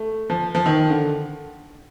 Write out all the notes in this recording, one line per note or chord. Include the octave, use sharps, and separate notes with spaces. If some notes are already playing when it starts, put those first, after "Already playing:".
Already playing: A3
F3
F3
D#3
D3